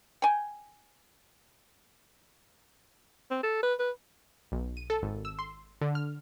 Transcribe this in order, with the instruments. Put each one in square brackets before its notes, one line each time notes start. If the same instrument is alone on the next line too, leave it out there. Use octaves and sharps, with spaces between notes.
[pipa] G5 G#5
[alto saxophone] C4
A4
B4
B4
[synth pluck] B1
D#7
A4
G#1
E6
C6
D3
F6